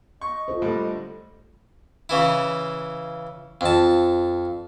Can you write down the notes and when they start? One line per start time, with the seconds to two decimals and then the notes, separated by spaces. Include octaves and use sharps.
0.21 D#5 C#6
0.48 F4 A4 C5
0.62 A2 D3 G3
2.09 C#3 E3 E4
3.61 F2 A5